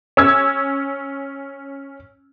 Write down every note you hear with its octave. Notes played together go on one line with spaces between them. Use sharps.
C#4 E6 G#6